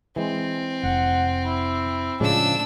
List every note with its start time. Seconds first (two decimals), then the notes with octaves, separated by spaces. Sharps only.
0.16 E3 G#3 C4
0.83 F1 F#5
1.46 E4
2.20 A2 C#3 F3 G#3 D4 E6